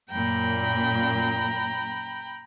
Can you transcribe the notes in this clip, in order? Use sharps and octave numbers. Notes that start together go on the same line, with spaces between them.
F#2 A#2 G5 A#5 B5